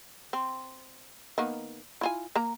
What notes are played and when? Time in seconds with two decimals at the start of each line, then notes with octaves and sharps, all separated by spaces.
0.33 C4
1.38 D#3 A#3 B3
2.01 E4 F4 G#5
2.36 A#3 A#5